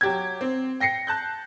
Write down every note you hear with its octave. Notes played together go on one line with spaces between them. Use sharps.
F#3 G4 G#6
C4
G5 A#6 C7 C#7
A5 F#6 G6